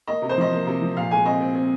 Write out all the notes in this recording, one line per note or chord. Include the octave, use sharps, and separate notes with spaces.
A#3 D#5
C3
C5
F3 D#5
A#3
C3
F3
A#2 F5
G#3 G#5
C4 D#5
C4
C4